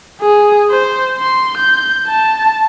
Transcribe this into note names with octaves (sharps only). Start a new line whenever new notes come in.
G#4
C5
C6
G6
A5